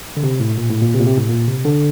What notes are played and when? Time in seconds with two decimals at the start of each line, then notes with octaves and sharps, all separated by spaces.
0.17 D3
0.23 C3
0.40 A2
0.58 A#2
0.70 A2
0.82 A#2
0.94 C3
0.99 A#2
1.06 C3
1.17 A2
1.29 A#2
1.47 C3
1.65 D3